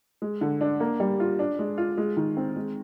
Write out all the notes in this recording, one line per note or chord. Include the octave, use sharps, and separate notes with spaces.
G#3
D3
D4
A#3
G3
F4
D4
G#3
F4
G#3
D#3
C4
G#3